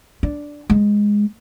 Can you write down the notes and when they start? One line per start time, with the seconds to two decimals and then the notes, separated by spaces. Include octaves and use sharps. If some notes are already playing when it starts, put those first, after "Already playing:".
0.23 D4
0.70 G#3